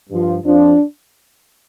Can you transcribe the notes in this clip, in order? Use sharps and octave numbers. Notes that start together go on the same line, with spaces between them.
G2 F3
F2 F3 D4